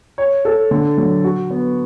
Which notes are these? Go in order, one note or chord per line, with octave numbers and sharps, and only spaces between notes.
C#5
A4
D3
F#3
F#4
B3